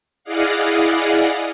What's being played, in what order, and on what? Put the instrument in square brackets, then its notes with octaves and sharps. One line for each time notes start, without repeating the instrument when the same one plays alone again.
[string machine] E4 G#4 D5 D#5 F5 F#5